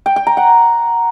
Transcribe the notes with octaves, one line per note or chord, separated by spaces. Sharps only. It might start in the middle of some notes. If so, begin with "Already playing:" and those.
G5
G5
A#5
F#5